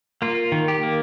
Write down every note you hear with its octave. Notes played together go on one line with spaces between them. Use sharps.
A#3 F4
D#3
G4
A#3